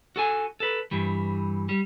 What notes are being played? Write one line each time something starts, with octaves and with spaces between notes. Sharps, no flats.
F#4 A4 G#5
A4 B4
G2 E3 G3
G3